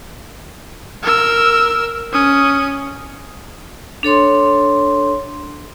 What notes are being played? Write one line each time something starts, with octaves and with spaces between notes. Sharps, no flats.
A#4 E6
C#4 D#6
D4 A4 C#5 C6